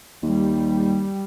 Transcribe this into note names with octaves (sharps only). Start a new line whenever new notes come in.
D#2 G3